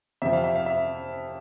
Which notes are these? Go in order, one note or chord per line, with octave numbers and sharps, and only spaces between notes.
F2 C3 F3 E5
F5
E5
F5
E5